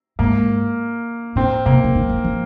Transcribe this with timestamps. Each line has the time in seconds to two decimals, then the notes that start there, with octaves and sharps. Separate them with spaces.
0.19 G#2 A#3
1.36 A#2 C4
1.66 C3 A#3
1.84 C3
1.95 D#3
2.09 F3
2.24 F3